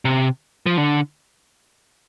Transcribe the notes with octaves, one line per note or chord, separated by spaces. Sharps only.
C3
F3
D3